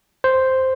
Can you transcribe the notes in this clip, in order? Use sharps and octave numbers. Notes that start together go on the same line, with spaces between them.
C5